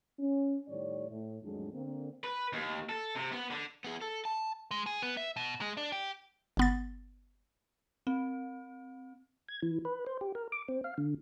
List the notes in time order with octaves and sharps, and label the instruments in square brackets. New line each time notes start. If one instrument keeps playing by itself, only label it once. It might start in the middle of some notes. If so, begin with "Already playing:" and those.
[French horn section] C#4
A2 D#3 G3 C#5 D5
A2
F2 A2 D#3 F#3 G#3 D4
D3 A#3 C4
[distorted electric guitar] B4
D#2
A4
C3
B3
D3
[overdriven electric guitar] B3 G#4
A4
A5
[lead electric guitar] G#3
G#4
B3
E5
B2
G#3
D4
G4
[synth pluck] G1 B3 A6
[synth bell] C4
[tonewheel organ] G#6
E3
B4
C5
G4
A#4
D6
C4
F5
D3